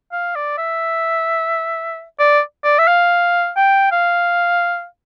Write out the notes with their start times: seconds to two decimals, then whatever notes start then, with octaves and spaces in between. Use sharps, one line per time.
0.12 F5
0.36 D5
0.58 E5
2.19 D5
2.64 D5
2.79 E5
2.87 F5
3.56 G5
3.92 F5